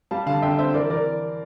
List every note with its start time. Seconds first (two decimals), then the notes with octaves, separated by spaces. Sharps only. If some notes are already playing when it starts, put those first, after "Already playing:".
0.11 G3 F5 A5
0.26 D3 F5 A5
0.42 D3 E5 G5
0.59 C4 C5 E5
0.74 E3 A#4 D5
0.90 E3 A#4 D5